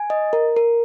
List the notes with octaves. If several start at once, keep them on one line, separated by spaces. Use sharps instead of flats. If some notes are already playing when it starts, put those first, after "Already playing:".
Already playing: G#5
D#5
A#4
A#4